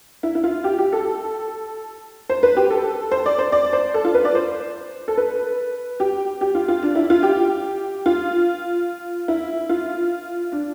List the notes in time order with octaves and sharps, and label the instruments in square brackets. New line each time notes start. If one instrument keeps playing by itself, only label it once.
[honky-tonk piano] E4
E4
F4
G4
G4
A4
C5
B4
G4
A4
C5
D5
C5
D5
C5
A4
F4
B4
D5
C5
A4
B4
G4
G4
F4
F4
D4
E4
F4
G4
F4
E4
F4
D4